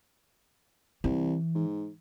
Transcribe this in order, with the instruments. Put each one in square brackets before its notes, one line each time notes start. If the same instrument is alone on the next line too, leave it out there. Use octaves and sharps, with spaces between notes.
[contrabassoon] C2 [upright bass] E3
[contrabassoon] G#2